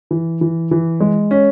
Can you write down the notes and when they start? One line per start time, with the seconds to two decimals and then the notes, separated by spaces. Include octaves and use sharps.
0.11 E3
0.41 E3
0.71 E3
1.00 G#3
1.31 C#4